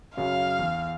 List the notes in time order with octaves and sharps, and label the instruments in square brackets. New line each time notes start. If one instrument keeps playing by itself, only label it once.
[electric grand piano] F#2 C#3 F#3 [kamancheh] F5
[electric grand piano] E2